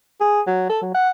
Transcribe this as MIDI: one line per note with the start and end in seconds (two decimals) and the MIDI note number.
0.21 0.41 68
0.47 0.70 54
0.70 0.81 69
0.82 0.93 54
0.95 1.10 78